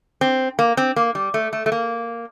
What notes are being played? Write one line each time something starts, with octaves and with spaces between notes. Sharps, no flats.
C4
A#3
C4
A#3
G3
A3
A3
A3
A#3